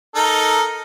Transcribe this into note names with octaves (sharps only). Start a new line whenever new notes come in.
D#4 A4 A#4